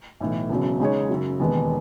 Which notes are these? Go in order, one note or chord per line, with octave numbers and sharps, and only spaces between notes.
B1 A2 E3
E1 E2 C#3 F#3
C#3 G#3 D#4 G#4 C#5
F#2 C#3 F#3
E1 D#2 D#3 G#3 B3